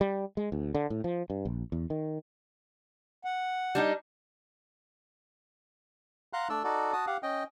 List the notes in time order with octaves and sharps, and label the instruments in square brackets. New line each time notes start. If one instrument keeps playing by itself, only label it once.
[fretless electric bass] G3
G#3
D2
D3
A2
F3
G2
A#1
E2
D#3
[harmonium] F#5
[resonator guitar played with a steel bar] G3 D4 D#4
[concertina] F5 F#5 A#5 C6 F#6
A3 D4 D5 E6
D#4 F#4 A4 D5
F#4 A5 D#6
G4 F5 F#5
C#4 D#5 G5